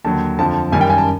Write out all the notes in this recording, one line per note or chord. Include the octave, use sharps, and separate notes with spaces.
D#2 D3 F#3 A5
F2 D3 F3 A5
F#2 D#3 G3 G#5
G5
G#5
A5